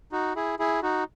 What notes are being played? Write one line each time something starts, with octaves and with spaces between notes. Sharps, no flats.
D#4 F#4
E4 G#4
E4 G#4
D#4 F#4